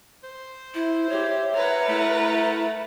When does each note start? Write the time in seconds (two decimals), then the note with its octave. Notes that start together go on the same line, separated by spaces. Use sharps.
0.23 C5
0.75 E4 E5
1.09 G4 C#5
1.55 A#4 B4 C#5 F#5
1.89 A3 E4